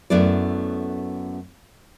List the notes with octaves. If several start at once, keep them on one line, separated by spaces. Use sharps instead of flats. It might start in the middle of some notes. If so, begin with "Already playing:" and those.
F#2 A3 B3 E4 D5